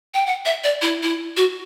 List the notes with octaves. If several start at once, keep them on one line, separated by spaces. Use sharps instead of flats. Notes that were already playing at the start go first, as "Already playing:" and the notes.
G5
F#5
E5
D5
E4
E4
F#4